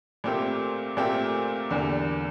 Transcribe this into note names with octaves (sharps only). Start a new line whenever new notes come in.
A#2 A3 C4 G4 A#4
A#2 A3 C4 G4 A#4
E2 D3 G3 A#3